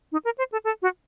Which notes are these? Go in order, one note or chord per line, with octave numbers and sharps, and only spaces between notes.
D#4
A#4
C5
A4
A4
F#4